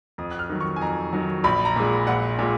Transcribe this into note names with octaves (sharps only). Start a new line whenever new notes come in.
F2 D#6
F#6
F6
D#3 F#3
C#6
G#5
F2 A#5
D#3 F#3
A#1 B5
A#5
A#2 G#3
A#1 F#5
A#2 G#3